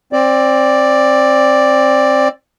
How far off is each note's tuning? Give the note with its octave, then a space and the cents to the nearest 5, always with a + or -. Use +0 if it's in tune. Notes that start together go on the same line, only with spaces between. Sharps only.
C4 +20 D5 +0